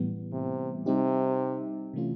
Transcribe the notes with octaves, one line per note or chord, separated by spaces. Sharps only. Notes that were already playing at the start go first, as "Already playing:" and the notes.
Already playing: A2 E3 G3 B3
C3
C3 G3 C4 D#4 G4
C3 E3 A3 C#4 F4